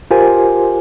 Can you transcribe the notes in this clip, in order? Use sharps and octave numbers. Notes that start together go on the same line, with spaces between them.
F4 G4 A#4 C5 G#5